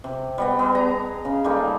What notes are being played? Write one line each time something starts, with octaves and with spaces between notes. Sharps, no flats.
C3
G3 B3 D#5
B3 G#4
A#5
C#3
G3 A3 A#3 D#4